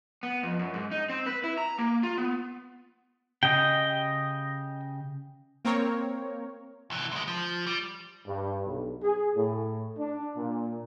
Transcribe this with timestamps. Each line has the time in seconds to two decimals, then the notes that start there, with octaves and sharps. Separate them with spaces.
0.23 B3
0.43 F2
0.59 F#2
0.74 G#2
0.91 D#4
1.10 C4
1.26 B4
1.44 E4
1.58 A#5
1.78 A#3
2.03 F4
2.17 B3
3.43 C#3 G4 D#5 G5
5.65 A#3 C4 A#4 C#5
6.90 C2 E3
7.11 D2 G#3
7.27 F3
7.67 G3
8.26 G2
8.66 B1
9.02 G#4
9.35 A2
9.98 D4
10.37 A#2